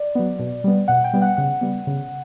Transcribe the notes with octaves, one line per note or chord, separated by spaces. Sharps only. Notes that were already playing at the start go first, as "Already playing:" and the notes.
Already playing: D5
F#3 B3
B2
G3 B3
B2 F#5
G5
G3 B3
F#5
C#3 F#5
G3 B3
C#3